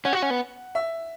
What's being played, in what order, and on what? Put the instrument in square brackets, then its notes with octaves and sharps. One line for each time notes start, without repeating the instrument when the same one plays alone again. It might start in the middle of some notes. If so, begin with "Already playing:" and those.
[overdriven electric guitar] C#4 [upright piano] F#5
[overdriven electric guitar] F#4
C#4
B3
[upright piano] E5